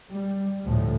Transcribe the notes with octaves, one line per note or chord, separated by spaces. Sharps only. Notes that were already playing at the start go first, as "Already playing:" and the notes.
G3
D2 A2 F3